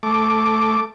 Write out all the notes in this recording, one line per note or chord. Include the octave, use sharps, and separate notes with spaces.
A3 D6